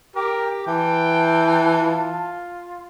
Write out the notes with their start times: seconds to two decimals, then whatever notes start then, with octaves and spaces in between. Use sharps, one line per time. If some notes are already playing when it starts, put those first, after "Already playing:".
0.15 G4 A#4 G5
0.67 E3 G5 A5
1.79 F4